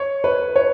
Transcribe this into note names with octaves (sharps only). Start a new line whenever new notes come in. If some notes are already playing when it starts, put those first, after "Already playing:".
Already playing: C#5
B4
C#5